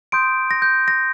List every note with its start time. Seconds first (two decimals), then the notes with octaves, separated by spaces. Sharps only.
0.12 C6 D#6 G6 D7
0.51 A#6
0.62 G6
0.88 A#6